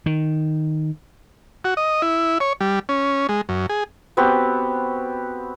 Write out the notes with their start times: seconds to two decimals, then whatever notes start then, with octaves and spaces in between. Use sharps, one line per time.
0.06 D#3
1.64 F#4
1.77 D#5
2.02 E4
2.40 C#5
2.61 G3
2.89 C#4
3.29 G#3
3.49 F#2
3.69 G#4
4.17 B3 C4 F#4 G4